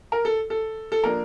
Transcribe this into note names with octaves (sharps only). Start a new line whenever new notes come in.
A#4
A4
A4
A4
F3 A#3 D4 A#4